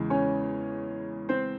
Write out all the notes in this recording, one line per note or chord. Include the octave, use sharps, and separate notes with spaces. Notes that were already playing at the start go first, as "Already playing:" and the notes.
Already playing: E2 C#3 E3 G#3
C#4 C#5
C4 C5